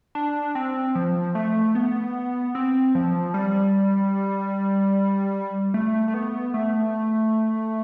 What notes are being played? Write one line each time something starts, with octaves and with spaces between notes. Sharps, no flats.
D4
C4
F3
A3
B3
C4
F3
G3
A3
A3
B3
A3